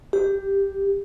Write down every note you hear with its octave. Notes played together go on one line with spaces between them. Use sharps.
G4